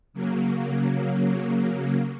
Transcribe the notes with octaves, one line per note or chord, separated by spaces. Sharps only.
C#3 F#3 A#3